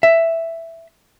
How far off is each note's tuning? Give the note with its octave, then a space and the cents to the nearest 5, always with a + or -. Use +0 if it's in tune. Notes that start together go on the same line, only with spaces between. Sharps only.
E5 +5